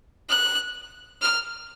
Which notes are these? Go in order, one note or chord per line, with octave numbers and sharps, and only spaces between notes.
F#6
F6